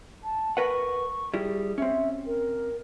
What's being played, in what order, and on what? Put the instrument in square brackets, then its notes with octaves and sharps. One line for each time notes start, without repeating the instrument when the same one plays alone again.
[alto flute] A5
[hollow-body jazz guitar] A#4 B4 F#5 [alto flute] C#6
[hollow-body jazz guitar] G3 E4 [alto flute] G#4
[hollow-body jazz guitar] C4 C#4 [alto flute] E5
[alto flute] A#4